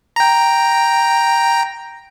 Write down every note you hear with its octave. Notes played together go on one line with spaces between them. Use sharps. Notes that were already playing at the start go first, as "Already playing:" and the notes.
G5 A#5